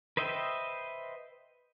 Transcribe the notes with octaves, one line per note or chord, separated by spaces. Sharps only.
B4 C5 D#5 E5 G5